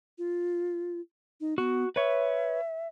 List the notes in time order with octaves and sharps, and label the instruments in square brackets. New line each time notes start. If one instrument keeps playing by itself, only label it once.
[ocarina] F4
D#4
[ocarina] B3 [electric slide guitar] F#4
[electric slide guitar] B4 C#5 [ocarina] E5